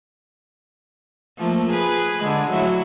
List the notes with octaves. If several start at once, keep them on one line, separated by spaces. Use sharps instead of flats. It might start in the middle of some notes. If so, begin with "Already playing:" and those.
F3 A3 A#3
G#4 B4
D3 G#3
F#3 A3 E4